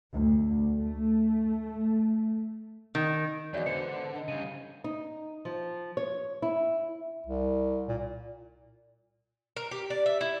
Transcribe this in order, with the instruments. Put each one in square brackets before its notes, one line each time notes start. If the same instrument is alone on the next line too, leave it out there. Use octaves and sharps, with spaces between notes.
[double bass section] D2
A3
[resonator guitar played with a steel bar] D#3
[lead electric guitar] E2 [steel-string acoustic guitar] F#3 G#3 [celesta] D5 E5
[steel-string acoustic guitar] G#2 B3 C5 [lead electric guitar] D3 [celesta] C#7
[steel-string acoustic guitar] D#4
[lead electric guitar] C#3 G3 [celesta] D#7
[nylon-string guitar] D#4
F3
C#5
E4
[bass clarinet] C2
A#2
[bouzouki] A#4
G4
D5
E5
E4